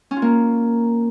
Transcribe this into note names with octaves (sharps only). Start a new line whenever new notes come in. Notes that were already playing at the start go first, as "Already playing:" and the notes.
C#4
F4
A#3